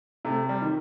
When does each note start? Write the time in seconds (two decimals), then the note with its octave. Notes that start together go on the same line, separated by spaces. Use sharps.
0.25 C3 A3
0.49 G3
0.62 D#3